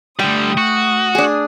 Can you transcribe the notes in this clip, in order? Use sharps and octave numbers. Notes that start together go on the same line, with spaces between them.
D3 G3 A3 G5 D#6
F#4
D4 G#4